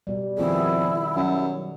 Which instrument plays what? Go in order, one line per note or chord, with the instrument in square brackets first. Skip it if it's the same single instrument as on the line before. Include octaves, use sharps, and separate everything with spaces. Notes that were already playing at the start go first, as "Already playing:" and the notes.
[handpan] B2 G3
[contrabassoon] F2 [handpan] D#3 B3 G#4 [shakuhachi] E4
[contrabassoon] F#2